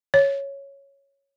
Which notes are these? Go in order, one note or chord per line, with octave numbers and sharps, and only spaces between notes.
C#5